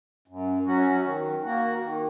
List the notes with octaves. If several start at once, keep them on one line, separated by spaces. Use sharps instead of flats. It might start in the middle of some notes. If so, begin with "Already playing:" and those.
F#2
F#3 C#4 F#4
D#3
A#3 F#4
D#3